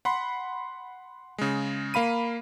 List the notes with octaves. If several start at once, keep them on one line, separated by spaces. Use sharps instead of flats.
F#5 B5 C6
C#3 G#3
A#3 F5 B5 D#7